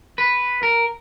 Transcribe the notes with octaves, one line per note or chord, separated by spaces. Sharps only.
B4
A#4